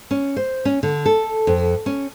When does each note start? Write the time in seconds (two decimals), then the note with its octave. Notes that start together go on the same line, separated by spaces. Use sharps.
0.11 C#4
0.37 C5
0.65 C#4
0.83 D3
1.06 A4
1.47 F2
1.86 C#4